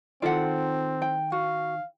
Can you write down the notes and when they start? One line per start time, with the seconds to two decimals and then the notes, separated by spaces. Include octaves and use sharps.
0.22 D#3 C4 F4 A4 D5 F#5
1.02 G5
1.32 F#4 F5